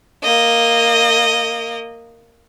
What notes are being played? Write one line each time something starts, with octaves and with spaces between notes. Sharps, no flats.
A#3 D#5